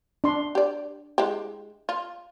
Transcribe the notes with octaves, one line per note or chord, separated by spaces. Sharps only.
D4 C6
G4 D5
G#3 E4 G4
F4